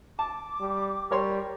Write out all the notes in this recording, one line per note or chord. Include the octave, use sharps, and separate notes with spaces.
A5 D6
G3
G3 A#4 C#5 C6